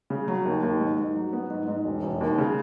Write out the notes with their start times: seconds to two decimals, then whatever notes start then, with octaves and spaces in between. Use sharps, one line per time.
0.10 C#3
0.28 F#3
0.45 D#2
0.63 D#2
0.80 G#2
0.98 G#2
1.16 F#3
1.33 B3
1.50 G#2
1.68 G#2
1.85 E1
2.03 E1
2.21 D#2
2.38 C#3